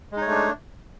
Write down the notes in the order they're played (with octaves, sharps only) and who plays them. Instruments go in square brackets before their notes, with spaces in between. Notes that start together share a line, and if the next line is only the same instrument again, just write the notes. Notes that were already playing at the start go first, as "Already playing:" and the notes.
[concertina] G#3
D#4
C#5
A3
D4